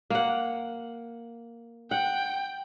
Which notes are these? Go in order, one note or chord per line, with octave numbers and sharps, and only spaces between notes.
A#3 F#5
F#5 G5